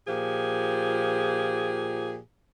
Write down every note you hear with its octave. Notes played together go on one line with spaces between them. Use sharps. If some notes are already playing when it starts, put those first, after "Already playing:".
A#2 F3 G4 G#4